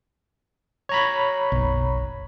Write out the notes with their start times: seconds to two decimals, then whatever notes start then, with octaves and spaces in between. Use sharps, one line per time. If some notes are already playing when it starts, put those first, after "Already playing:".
0.89 C#5 A#5 B5
1.52 F#1 B1